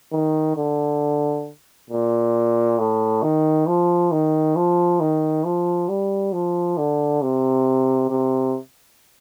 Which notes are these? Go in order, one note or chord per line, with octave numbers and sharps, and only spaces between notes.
D#3
D3
A#2
A2
D#3
F3
D#3
F3
D#3
F3
G3
F3
D3
C3
C3